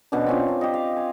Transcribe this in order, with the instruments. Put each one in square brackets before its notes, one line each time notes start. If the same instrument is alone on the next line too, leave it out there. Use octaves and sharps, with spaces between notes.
[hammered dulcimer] B2 D3 C#4 D4
C4 C#4 F4
D4
G4 D#5
F5
G#5